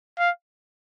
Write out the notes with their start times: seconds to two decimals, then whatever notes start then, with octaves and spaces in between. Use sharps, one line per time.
0.19 F5